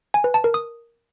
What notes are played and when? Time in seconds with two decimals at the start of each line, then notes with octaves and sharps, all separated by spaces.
0.14 G#5
0.24 B4
0.34 A5
0.44 A#4
0.54 D#6